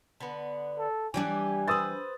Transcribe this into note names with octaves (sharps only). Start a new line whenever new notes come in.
D3 B3
A4
E3 G3 D4 G4 G#5
B4 C5 D#6 E6 A6